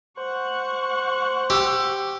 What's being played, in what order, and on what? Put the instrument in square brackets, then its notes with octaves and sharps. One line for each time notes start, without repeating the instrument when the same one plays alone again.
[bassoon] C5 [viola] F#5 C#6
[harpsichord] G4 [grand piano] E6